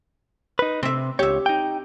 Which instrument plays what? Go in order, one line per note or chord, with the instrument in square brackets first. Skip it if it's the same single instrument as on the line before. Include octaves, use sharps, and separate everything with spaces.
[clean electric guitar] D#4 B4
[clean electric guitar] C3 [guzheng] C4 E5
[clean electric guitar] C#2 C#5 [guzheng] G4 E5
[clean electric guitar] D#4 G5